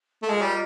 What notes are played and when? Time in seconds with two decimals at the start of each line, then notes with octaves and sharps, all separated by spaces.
0.23 A3
0.28 G#3 F4 A#4 D#5
0.41 G3